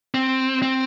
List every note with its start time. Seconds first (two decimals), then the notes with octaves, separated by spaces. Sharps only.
0.14 C4
0.62 C4